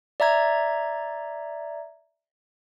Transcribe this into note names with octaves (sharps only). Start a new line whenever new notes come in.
D5 E5 A#5 G#6